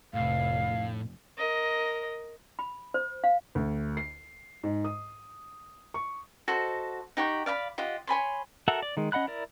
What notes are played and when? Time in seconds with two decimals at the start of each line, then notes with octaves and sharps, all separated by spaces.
0.14 F1 A2 F5
1.37 A#4 D#5
2.59 B5
2.94 C5
3.24 F5
3.55 D2
3.97 C7
4.63 G#2
4.85 D#6
5.94 C#6
6.48 F#4 A4 C5 D#5
7.17 D#4 G4 F#5 C#6
7.46 D5 F5 A#5 B5
7.78 F4 G4 D#5 F#5
8.07 C#5 G#5 B5 C6
8.68 F#4 A4 A#4 E5 F#5
8.82 D5
8.97 D#3 G#3
9.12 C#4 D#5 F#5 B5 F#6
9.27 E4 A#4 D5